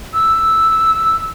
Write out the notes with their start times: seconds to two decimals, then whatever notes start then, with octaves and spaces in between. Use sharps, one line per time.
0.14 E6